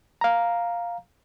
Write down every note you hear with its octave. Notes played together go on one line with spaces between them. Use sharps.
F5 A#5